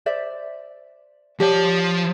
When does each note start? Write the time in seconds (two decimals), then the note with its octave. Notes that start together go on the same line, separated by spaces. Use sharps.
0.06 C5 D5 E5
1.40 F3 G4 C#5 D5 A5